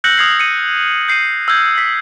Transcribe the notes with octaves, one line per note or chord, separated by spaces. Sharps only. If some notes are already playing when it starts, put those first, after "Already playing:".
E6 F#6 G6 A#6 C#7 F#7
D#6 F6 G#6 C7 F#7
C#7 D#7
G6 C7 C#7 D#7
E6 F6 G6 G#6
B6